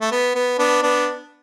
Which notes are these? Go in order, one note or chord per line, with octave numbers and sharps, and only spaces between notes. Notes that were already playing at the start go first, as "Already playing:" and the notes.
A3
B3
B3
B3 D4
B3 D4